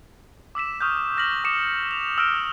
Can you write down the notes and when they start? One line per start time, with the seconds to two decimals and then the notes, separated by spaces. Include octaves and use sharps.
0.55 D6 E6 B6 E7
0.81 C#6 D#6 F6 G6
1.17 F6 A#6 B6 F#7
1.44 D6 D#6 C#7 E7
1.91 F7
2.18 E6 F6 A#6 C#7 D7 E7